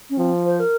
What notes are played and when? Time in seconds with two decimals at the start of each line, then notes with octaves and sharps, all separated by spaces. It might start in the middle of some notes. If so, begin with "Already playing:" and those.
0.10 C#4
0.17 F3 C4
0.46 C5
0.60 A#4